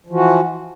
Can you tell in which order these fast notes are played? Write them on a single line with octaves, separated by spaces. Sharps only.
F3 E3 F#4